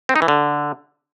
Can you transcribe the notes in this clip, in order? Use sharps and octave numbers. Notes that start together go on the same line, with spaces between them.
C4
D#4
E3
D3